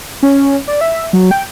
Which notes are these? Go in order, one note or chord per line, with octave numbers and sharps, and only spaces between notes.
C#4
D5
E5
F#3
G5